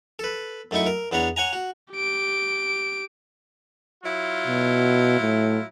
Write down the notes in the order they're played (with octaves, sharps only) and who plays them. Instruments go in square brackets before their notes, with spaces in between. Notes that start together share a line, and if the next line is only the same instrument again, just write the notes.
[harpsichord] A4 B4
F#2 A3 D#4 E4 C#6
A#4
E2 B3 D4 C#5 A#5
C#5 F#5 G#5 A#5
F#4
[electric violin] G4 D7
[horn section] F#3 E4 F4
[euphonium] B2
A2